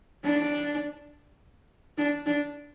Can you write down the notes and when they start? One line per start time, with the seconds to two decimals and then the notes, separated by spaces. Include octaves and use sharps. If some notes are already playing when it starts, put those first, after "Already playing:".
0.24 D4
1.98 D4
2.26 D4